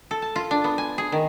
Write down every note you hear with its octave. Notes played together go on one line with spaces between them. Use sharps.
A4
A5
F4
D4
B3
G#5
G#4
D#3